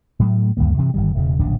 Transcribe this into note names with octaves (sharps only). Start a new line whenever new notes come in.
A2 F#3 A3
D2 G2 D#3 A#3
G2 C3 E3
G1 D#3 G3
E1 A#2 C#3
D1 A#1 C#3 D4